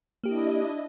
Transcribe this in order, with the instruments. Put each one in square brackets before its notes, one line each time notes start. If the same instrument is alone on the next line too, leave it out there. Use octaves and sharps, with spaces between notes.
[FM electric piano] A#3 G4 [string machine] D4 E4 D#5